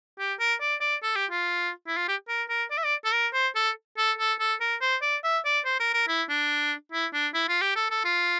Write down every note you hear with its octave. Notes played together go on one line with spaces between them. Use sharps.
G4
A#4
D5
D5
A4
G4
F4
E4
F4
G4
A#4
A#4
D5
E5
D5
A4
A#4
C5
A4
A4
A4
A4
A#4
C5
D5
E5
D5
C5
A#4
A#4
E4
D4
E4
D4
E4
F4
G4
A4
A4
F4